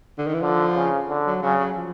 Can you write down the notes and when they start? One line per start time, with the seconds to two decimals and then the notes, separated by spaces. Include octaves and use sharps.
0.18 D3
0.26 D#3
0.34 E3
0.41 D3 F3
0.76 C#3
1.09 D3
1.26 F#3
1.43 C#3 F#3
1.59 F#3
1.77 F3